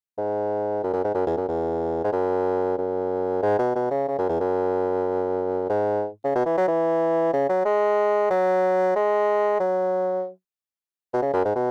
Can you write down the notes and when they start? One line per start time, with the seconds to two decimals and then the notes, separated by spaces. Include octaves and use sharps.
0.18 G#2
0.83 F#2
0.93 F#2
1.04 G#2
1.15 F#2
1.27 E2
1.37 F#2
1.48 E2
2.04 G#2
2.12 F#2
2.78 F#2
3.43 G#2
3.59 B2
3.76 B2
3.91 C#3
4.08 C#3
4.19 F#2
4.29 E2
4.40 F#2
5.70 G#2
6.24 C#3
6.35 B2
6.46 E3
6.57 F#3
6.68 E3
7.33 C#3
7.49 F#3
7.65 G#3
8.30 F#3
8.96 G#3
9.60 F#3
11.14 B2
11.22 C#3
11.34 F#2
11.45 G#2
11.56 B2